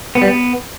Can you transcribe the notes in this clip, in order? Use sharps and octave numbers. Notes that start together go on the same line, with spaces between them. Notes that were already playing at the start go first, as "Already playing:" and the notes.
B3
G3
B3